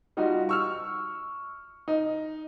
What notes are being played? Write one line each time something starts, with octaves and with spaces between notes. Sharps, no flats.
G3 D#4 F4 F#4
C#6 E6 F6
D#4